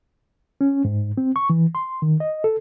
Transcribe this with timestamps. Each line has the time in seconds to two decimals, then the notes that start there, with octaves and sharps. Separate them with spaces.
0.61 C#4
0.85 G#2
1.17 C4
1.36 C#6
1.50 E3
1.75 C6
2.02 D#3
2.20 D#5
2.44 A4